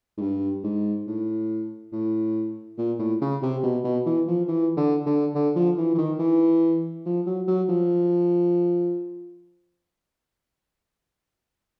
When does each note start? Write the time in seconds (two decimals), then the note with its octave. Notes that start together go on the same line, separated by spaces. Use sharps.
0.17 G#2
0.21 G2
0.64 G#2
1.07 A2
1.92 A2
2.78 A#2
2.99 A2
3.21 C#3
3.42 C3
3.63 B2
3.84 B2
4.06 E3
4.28 F3
4.48 E3
4.77 D3
5.06 D3
5.35 D3
5.56 F3
5.77 E3
5.94 E3
5.98 D#3
6.19 E3
7.06 F3
7.26 F#3
7.47 F#3
7.69 F3